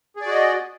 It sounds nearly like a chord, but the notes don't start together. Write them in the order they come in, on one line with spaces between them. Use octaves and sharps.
G#4 D5 F#4 D#5